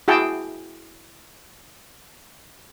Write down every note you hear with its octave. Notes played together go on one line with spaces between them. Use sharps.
E4 F#4 G#4 G5 A5